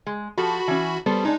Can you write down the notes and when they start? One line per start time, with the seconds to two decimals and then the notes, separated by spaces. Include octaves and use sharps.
0.06 G#3
0.38 F3 F#4 G4 A4 B5
0.68 E3 C#4
1.06 G3 B3 A4 C5
1.25 G#3 D4 D#4